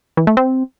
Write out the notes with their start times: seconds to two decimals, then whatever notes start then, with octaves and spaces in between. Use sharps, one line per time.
0.17 E3
0.27 A3
0.37 C4